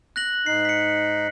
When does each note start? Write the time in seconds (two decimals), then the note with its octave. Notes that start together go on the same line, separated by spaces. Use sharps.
0.16 F#6 A#6 F#7
0.46 G#2 D#4 C7
0.65 B6 C#7